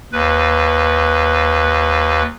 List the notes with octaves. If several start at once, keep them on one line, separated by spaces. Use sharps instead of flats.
D#2 B4